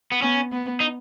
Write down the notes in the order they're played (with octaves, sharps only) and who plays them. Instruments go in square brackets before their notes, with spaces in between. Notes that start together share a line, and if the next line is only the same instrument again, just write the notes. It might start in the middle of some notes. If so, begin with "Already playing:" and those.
[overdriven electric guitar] B3
[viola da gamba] B3 [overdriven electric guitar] C#4
[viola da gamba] B3
[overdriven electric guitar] D#4